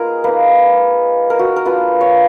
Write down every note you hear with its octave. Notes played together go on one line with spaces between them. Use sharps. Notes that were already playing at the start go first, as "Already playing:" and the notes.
Already playing: G#3 B3 D#4 F4 G#4 A#4
A#3 D#4 B4
A#4
F#4
A#4
A#3 D4 F4 B4
C#5